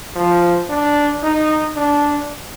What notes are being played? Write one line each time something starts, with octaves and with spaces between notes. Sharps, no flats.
F3
D4
D#4
D4